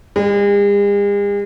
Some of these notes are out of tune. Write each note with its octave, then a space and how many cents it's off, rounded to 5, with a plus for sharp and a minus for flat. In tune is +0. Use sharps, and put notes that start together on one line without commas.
G#3 -45